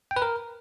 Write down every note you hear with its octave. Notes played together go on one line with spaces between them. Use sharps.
G5
B4
A#4